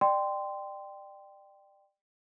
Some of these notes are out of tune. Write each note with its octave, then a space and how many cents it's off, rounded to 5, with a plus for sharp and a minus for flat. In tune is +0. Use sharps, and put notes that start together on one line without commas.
D5 +30 G5 +0 C6 -15